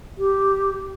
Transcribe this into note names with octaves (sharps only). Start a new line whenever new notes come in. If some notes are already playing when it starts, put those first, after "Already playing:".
G4